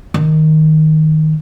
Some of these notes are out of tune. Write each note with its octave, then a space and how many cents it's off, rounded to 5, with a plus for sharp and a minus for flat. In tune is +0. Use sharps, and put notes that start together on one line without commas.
D#3 +5